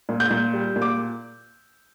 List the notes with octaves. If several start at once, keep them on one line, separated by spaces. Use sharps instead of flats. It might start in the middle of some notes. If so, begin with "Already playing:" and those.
A#2
G6
A#2
G3
A#2
D6